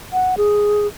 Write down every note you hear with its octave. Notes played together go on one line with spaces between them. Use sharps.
F#5
G#4